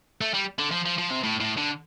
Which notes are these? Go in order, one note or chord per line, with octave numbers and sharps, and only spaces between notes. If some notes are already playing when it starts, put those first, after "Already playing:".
A3
G3
D3
F3
F3
F3
C3
A2
A2
D3